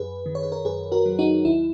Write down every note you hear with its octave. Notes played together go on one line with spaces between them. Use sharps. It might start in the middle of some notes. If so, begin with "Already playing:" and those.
Already playing: F#2 G#4 B4
D#3
C#5
B4
A#4 C#5
F#2 G#4 B4
F#4 A#4
F#3
D#4 F#4
D#2 E4